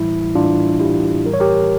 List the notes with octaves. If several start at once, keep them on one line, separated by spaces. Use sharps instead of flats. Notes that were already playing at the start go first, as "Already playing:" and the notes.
Already playing: A2 E3 G3 E4
A2 E3 G3 D4 F4
E4 G4
A2 E3 G3 A#4
C#5
G4 A#4